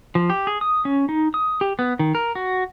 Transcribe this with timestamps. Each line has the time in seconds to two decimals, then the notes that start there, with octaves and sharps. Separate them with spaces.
0.15 F3
0.30 G4
0.47 G#4
0.61 D#6
0.85 C#4
1.09 D#4
1.34 D#6
1.61 G4
1.79 B3
1.99 D#3
2.15 A#4
2.35 F#4